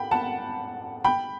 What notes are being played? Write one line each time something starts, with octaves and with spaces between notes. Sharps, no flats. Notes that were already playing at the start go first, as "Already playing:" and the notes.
Already playing: G5 B5
F#5 A5
G5 B5